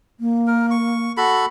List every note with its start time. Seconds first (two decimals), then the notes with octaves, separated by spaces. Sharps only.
0.20 A#3
0.47 A#4
0.71 C#6
1.17 F#4 A4 B5